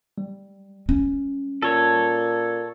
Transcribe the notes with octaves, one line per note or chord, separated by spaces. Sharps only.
G3
C#4
A#2 A4 C#5